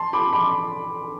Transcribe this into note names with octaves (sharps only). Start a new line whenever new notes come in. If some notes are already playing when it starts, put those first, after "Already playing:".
Already playing: A5 C6
B5 D6
B5 D6